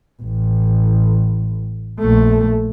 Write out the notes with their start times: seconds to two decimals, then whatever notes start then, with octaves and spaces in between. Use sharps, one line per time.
0.22 A1
1.99 A#1 A3